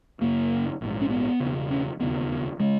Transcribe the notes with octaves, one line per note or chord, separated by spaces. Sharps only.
F#1 F#2 C#3 A#3
A#1 G#2
C#4
B3
E1 E2 C#3
C#4
E1 D#2 C#3 B3
C#3 G#3